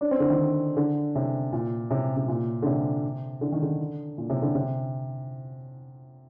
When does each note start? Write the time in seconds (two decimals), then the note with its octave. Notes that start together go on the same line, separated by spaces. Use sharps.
0.01 D4
0.11 C4
0.20 D3
0.30 D#3
0.77 D3
1.15 C3
1.53 A#2
1.91 C3
2.16 C3
2.28 A#2
2.62 D3
2.66 C3
3.41 D3
3.52 D#3
3.62 D3
4.18 A#2
4.30 C3
4.42 D3
4.55 C3